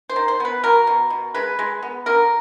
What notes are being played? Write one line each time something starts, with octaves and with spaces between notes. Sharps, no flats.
C5
D#3
C5
B3 B4
F#3 A#4
B2
B2
G#3 B4
G#3
B3
D3 A#4